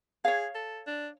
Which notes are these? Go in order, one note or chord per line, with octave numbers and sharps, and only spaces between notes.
G#4 C#5 F5
A4
D4